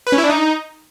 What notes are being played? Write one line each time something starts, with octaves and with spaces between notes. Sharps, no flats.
B4
C#4
E4
D4
D#4